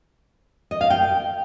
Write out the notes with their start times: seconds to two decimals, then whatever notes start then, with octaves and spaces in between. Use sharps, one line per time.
0.71 D#5
0.81 F5
0.90 G5